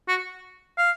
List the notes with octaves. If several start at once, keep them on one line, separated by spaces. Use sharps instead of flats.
F#4
F5